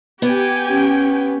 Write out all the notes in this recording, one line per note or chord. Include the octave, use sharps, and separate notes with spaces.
B3 G4 G5 G#5
C#4